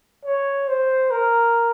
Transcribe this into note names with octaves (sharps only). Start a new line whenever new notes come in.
C#5
C5
A#4